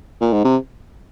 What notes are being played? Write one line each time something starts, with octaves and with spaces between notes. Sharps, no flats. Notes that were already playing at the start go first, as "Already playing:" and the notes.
A#2
G#2
C3